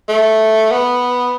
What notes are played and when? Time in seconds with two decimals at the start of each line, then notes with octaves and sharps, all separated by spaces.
0.09 A3
0.71 B3